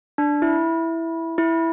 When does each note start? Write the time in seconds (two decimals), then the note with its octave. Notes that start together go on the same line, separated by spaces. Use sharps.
0.18 D4
0.42 E4
1.38 E4